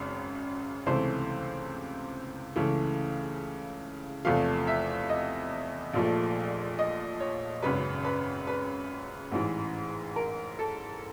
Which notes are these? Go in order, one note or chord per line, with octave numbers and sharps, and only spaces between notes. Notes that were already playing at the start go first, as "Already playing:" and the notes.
Already playing: G#1 F#2 C#3
C#2 C3 E3 A3 C5
C#2 C#3 E3 A3
E2 C3 F3 A3 F5
E5
D#5
A#1 A#2 F3 A3
D#5
C#5
G#1 F#2 C#3 B4
B4
B4
A1 G#2 E3
A#4
A4